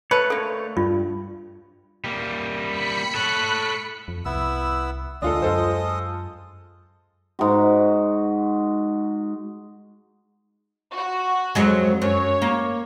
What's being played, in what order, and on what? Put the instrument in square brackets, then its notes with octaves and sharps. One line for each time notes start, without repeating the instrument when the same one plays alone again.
[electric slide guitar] A3 C#5 [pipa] A4 B4
[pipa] D3 A#3 [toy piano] A4
[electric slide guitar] G2 [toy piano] F4
[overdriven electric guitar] G3 A#3
[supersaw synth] B5 B6 C#7
[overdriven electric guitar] A4 C#5 [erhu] F#6
[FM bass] F2
[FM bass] C2 [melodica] B3 E4 E6
[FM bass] D2 [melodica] G#3 D#5 D#6 [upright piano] D4 F4 A4
[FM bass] F#2 [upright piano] F4 A4 C5
[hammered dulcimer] G#2 F#4
[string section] F#4
[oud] F2 F#3 G#3
[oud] F#2 [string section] C#5
[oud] A#3